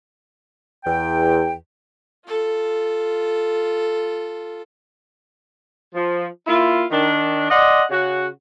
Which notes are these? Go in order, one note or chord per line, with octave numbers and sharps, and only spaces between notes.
E2 G5
F4 A4
F3
A#3 E4 F4
D#3 D4
D5 D#5 F#5 C6
C#3 F#4